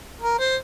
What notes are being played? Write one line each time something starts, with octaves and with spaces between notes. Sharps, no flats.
A#4
C5